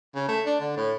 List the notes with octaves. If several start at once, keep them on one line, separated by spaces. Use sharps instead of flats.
C#3
A3
D4
D3
A2